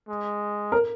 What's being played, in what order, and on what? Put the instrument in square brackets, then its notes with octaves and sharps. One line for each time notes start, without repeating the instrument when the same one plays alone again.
[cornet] G#3
[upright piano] A#4